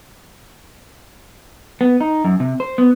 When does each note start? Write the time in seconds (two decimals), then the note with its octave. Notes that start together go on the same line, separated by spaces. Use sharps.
1.81 B3
2.01 D#4
2.24 F#2
2.40 C3
2.60 C5
2.78 B3